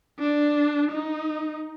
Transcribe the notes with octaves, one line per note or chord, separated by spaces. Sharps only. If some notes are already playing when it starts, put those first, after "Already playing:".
D4
D#4